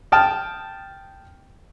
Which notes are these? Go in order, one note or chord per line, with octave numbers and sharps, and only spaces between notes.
G5 A5 D#6 F6